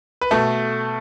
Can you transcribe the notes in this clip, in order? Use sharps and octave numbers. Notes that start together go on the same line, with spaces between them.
B4
B2 A3 A4